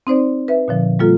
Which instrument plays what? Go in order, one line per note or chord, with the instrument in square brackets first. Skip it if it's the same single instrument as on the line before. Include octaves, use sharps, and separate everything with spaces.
[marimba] C4 D#4 C5 D5
B4 E5
A#2 D3 F3
G3 A#3 F4 A4